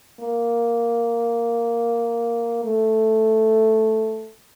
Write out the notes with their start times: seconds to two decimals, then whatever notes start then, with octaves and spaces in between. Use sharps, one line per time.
0.20 A#3
2.64 A3